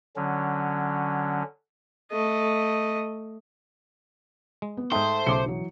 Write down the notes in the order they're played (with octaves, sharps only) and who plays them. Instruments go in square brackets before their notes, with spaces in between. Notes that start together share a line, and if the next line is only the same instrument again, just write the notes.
[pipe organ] D3 F#3 C#4
[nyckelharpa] A3 D#5
[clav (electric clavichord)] G#3
[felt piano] B3
[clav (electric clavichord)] G#2 D#4 [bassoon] A3 [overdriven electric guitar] C5 [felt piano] G5 D#6
[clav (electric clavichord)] B1 C#3 [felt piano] C6 D6 C#7
[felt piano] E3 F#3